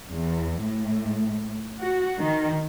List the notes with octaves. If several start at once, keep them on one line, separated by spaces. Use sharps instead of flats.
E2
A2
F#4
D#3